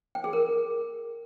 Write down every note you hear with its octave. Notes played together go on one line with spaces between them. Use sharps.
G5
G#4
A#4